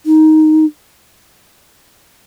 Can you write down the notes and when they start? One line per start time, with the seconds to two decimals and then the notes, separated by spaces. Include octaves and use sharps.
0.06 D#4